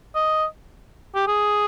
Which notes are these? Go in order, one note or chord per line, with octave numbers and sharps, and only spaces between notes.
D#5
G4
G#4